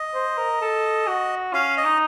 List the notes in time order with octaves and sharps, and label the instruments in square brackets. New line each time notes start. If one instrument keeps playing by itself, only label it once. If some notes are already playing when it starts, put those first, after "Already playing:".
Already playing: [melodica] D#5
[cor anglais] C5
A#4
A4
F#4
[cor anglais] C#4 [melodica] F5
[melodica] D#5
[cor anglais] D#4